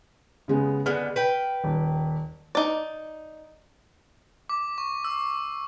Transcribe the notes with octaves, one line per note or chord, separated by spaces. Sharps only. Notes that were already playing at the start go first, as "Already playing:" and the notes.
C#3 G#3 B3
D3 G#3 B3 F6
B4 G5
D#1
D#4 D5
D6
C#6
E6